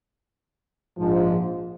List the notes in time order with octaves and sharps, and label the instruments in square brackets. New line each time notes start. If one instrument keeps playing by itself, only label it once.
[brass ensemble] A#1 G#2 F3